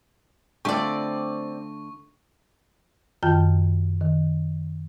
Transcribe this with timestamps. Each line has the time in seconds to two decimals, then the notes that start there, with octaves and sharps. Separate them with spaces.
0.65 D3 A3 C4 F4 D5 C#6
3.23 F#2 D#3 F4 G5 A5 G6
4.01 D#3